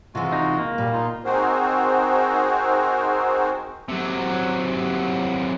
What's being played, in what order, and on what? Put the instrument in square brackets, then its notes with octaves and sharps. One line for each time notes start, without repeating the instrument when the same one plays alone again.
[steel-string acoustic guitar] C3 E3 [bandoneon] G#3 F4 F#4
[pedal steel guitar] D#4
A#3
[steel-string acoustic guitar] A#2 [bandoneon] G3
[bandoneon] D#4 F4
[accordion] C4 D#4 F#4 G#4 A#4 C5
[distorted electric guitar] C3 F#3